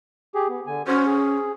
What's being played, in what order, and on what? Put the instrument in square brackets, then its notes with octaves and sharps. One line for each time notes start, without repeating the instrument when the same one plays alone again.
[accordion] G4 G#4
B3
D3 G#5
[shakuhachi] C#4 [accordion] F#4 C5
[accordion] G#4